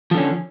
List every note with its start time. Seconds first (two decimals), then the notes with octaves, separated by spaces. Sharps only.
0.11 F3
0.14 D3
0.18 C#4